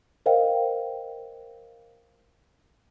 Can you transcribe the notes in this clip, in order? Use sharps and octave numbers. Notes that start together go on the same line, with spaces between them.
A#4 C5 D#5 F5 G5